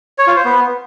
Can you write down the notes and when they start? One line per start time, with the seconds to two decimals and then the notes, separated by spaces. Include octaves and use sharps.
0.18 C#5
0.27 F4
0.36 C5
0.45 B3